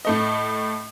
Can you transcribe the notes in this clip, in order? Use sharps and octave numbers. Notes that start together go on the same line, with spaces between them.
A2 A3 D#5